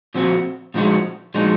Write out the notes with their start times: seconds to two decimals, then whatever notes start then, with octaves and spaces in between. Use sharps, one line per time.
0.14 A#2 F3 C4 F#4
0.74 A#2 F3 G#3 D#4 F#4
1.34 A#2 F3 G#3 D#4 F#4